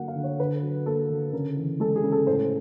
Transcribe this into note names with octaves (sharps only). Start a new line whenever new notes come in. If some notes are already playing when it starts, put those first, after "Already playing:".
Already playing: D3 F#3 A#3 F#5
F5
D3
C#5
D3 B4
F#3
A#3 A4
D3
C#3 A#4
E3
G#3 A4
G#4
C#3
A4
A2 C5